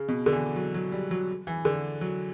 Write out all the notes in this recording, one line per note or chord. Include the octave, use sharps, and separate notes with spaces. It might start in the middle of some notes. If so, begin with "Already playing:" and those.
Already playing: C#3
B2
D3
E3
F#3
F#3
G3
F#3
E3
D3
F#3